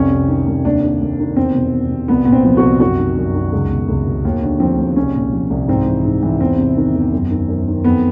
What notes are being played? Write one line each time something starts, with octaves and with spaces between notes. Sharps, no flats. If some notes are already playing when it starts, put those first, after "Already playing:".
Already playing: C2 F2 C#4
C3
D#3
C2
D#2 D4
D#3
D#2
D#3
E2 C4
B2
E2
B2
C2 B3
A#2 B3
C4
F3
F#4
C2
F#2 F#4
D#3
F#2
D#3
C#2
B2
C#2
B2
D#2
D3
F3 C4
D#2
C2 C#4
A#2
F3
C2
G#2 C4
E3
G#2
E3
E2 C4
C3
D#3
E2
F#2
D#3
F#2
D#3
F2 B3